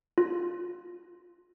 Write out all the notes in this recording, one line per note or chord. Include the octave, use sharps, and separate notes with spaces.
F4